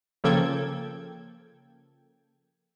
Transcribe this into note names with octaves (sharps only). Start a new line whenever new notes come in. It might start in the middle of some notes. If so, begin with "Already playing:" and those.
C#3 F3 A#3 A4 G5 G#6